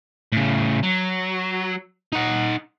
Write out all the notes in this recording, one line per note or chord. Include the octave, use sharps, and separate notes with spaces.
A2 C#3
F#3
D#4 F#5